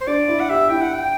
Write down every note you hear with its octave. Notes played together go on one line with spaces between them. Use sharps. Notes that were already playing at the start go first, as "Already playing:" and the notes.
C5
D4 D5
E4
F#5
G4 E5
E4 G5
F#5
G5